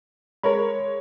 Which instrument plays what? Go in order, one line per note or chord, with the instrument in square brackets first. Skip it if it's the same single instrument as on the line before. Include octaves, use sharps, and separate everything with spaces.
[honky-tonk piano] G#3 C#5 [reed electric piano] A#4 B5